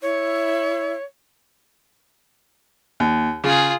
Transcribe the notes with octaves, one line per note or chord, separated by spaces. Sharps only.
E4 C#5
D#2
C#3 F4 G#4